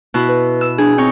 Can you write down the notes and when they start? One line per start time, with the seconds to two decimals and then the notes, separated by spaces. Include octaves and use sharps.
0.14 B2 E4
0.28 B4
0.61 E6
0.78 D4 G#4
0.98 C4 D#4 C#5 G5